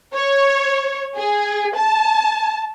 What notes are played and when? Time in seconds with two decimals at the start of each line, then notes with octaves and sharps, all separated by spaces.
0.14 C#5
1.17 G#4
1.75 A5